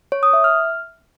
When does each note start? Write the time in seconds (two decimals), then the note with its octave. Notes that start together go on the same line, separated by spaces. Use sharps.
0.12 C#5
0.23 D#6
0.33 E5
0.44 F6